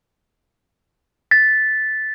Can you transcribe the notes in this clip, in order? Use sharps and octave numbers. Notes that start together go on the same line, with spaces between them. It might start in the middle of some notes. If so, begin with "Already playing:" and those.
A6 B6